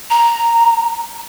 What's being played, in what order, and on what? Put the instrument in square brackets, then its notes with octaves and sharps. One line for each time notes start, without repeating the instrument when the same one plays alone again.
[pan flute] A#5